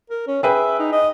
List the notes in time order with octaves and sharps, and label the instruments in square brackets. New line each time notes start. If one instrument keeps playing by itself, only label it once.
[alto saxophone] A#4
C#4
[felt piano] G#4 B4 G5 [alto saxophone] E5
[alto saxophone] D#4
D#5